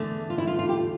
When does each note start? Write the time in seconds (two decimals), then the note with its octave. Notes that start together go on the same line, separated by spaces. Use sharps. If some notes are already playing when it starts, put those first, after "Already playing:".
Already playing: E2 D3 A3
0.30 F4
0.38 E4
0.47 F4
0.59 F4
0.69 G4